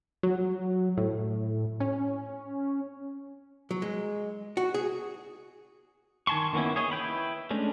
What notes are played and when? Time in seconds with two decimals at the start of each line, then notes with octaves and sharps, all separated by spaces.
0.23 F#3
0.97 A2
1.80 C#4
3.71 F#3
3.82 G#3
4.57 F#4
4.74 G#4
6.27 D#3 G#5 A5 C6 C#6
6.53 D#3 A#3 B3 C#4 E4
6.76 G#4 C#5 D#5
6.91 E4 B4 G5 B5
7.51 G#3 A3 C#4 D4